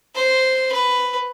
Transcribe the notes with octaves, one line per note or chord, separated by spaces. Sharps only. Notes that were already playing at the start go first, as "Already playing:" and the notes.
C5
B4